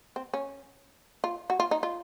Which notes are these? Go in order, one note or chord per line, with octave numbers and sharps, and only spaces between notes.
C4
C#4
F4
F#4
F4
D#4
F4